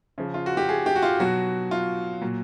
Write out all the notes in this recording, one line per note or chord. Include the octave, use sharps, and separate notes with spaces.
C#3 F3
F4
F#4
G4
G#4
G4
F#4
F4
B2 F#3 F#4
F4
A#2 F#3